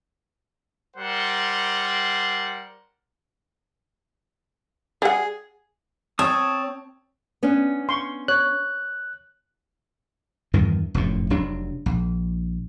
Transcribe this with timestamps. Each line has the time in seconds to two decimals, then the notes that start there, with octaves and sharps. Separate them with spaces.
0.96 G3 A#4 C5 F#5
5.02 G3 G#4 F#5
6.19 C4 C#5 A5 D#6
7.43 B3 C#4 D4
7.89 C6 C#6
8.28 C#5 F#6
10.53 E2 G2 D#3 E3
10.94 F1 F#2 A2
11.30 F1 C3 F#3 D4
11.86 A#1